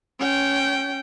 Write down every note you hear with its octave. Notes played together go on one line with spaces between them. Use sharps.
C#4 G5